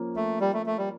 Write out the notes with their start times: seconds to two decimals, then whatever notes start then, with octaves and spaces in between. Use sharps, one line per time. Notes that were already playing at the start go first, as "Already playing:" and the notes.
Already playing: F3 A#3 C#4
0.16 A3
0.41 G3
0.53 A3
0.66 A3
0.78 G3